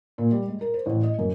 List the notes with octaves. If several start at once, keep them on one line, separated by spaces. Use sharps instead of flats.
A#2
G3
G#3
A#4
C5
A1
D#5
F#2